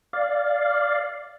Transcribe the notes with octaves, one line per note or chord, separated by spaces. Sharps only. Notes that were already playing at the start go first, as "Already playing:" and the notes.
D5 F5